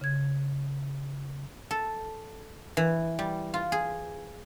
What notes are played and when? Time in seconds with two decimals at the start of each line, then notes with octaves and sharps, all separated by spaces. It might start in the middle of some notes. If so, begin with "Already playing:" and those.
0.01 C#3 G#6
1.71 A4
2.77 E3
3.19 G3
3.54 F4
3.72 G#4